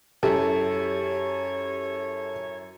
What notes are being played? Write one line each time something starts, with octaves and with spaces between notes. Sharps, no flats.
F#2 E4 G4 A4 C#5